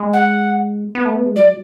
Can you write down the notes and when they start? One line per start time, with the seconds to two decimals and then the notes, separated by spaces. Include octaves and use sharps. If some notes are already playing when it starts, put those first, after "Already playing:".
Already playing: G#3
0.13 F#5
0.95 B3
1.05 A3
1.15 B3
1.26 G#3
1.36 F#3 D5